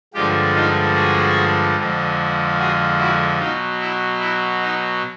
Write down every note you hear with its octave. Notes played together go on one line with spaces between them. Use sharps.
G2 D3 F3 G#3 F4 G4
D#4 F4
F#4 G#4
F2 D3 F3 G#3
F#4 G#4
E4 F#4
B2 F#3 D#4 F4
E4
E4
D#4